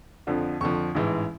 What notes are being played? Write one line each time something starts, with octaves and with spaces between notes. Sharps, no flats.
F2 D3 F3
F2 D3 F3 C#6
A1 G#2 E3 G#3